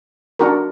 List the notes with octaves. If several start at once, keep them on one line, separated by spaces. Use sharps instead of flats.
D4 F#4 A#4